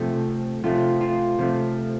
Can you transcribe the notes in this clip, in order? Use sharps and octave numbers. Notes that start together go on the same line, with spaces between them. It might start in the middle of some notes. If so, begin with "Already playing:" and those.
Already playing: C3 F3 A3
C3 F3 A3 F4
F4
C3 F3 A3